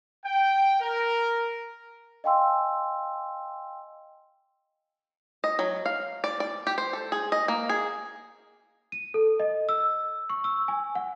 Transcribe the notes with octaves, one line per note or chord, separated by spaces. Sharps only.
G5
A#4
D#5 F5 G5 G#5 C6 E6
D#5
F#3
F5
D5
D5
G4
C5
A4
G#4
D#5
A#3
G#4
D#7
A4
D#5
E6
C#6
E6
G#5
F#5